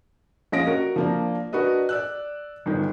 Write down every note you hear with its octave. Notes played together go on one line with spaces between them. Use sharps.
A#1 C#4 F4 D#5 A#6 D7
F#4 A#4
F3 A#3 D4
D4 F#4 A#4 B4 D#5
D5 E6 F#6
G1 D#3